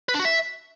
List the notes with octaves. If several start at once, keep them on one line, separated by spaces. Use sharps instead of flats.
B4
D4
F#4
E5